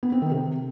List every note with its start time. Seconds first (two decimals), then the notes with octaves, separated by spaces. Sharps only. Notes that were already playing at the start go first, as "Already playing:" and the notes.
0.03 B3
0.12 C4
0.22 D#3
0.31 C3